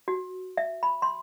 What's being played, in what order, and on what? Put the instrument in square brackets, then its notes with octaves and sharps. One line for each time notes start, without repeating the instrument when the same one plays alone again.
[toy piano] F#4
E5
B5
C6